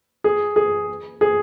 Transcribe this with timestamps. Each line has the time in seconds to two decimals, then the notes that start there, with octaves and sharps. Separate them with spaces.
0.24 G#4
0.56 G#4
1.21 G#4